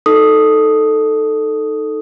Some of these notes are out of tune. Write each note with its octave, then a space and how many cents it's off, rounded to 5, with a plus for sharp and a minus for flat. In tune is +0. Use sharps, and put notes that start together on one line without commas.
D#4 +0 A4 +0 D#6 +0